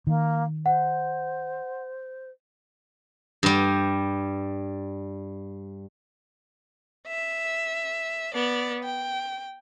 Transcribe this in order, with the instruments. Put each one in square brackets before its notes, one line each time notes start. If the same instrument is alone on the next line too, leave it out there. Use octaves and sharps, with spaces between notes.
[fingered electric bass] D#3 [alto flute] A#3
[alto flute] C5 [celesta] F#5
[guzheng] G2 G3
[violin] E5
B3 D5
G5